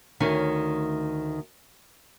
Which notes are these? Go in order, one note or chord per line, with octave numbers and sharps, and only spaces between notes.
D2 D#3 A3 C#4